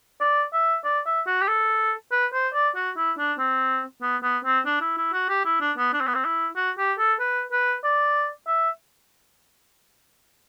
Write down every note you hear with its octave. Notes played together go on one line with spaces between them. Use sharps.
D5
E5
D5
E5
F#4
G4
A4
B4
C5
D5
F#4
E4
D4
C4
B3
B3
C4
D4
E4
E4
F#4
G4
E4
D4
B3
D4
C4
B3
C4
E4
F#4
G4
A4
B4
B4
D5
E5